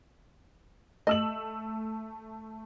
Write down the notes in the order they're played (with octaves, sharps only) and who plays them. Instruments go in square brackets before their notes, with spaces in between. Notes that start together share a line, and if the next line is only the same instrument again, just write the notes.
[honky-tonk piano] A3 E6 F#7 [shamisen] D#5